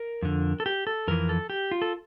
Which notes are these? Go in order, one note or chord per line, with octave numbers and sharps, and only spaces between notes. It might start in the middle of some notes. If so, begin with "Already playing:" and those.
Already playing: A#4
F2 D3
A4
G4
A4
F2 E3 A#4
A4
G4
F4
A4